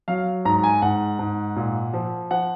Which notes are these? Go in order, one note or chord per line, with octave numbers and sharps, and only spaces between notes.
F#3 F5
G#2 A#5
G#5
G#2 F#5
G#2
A#2
F3
F3 F#5